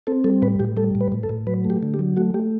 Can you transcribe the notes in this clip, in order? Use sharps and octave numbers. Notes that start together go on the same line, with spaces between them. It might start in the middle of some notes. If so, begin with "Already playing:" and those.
C4 A4
G3 A4
A2 B4
A2 G4
G3 A4
A2
B4
A2
A4
A2
F#3 B4
A3
G4
D3
G4
F#3
A3 F#4
A3 G4